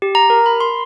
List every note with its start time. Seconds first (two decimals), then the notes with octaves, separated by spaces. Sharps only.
0.02 G4
0.15 A#5
0.30 A#4
0.46 B5
0.60 C6